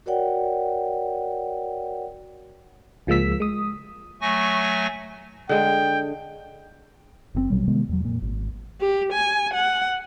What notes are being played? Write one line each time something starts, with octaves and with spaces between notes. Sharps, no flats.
F#4 A#4 C#5 D5 F#5 G5
C#2 F3 G#3 A#3 E6 B6
G#3 D#6
F#3 A3 G#5 C#6 A#6
D3 G#3 G5
F#1 A#2 C4
A#1 B2 F#3 G3
C3 D#3 G#3 B3
E2 F#3
F2 A#2
G#1
G4
G#5
F#5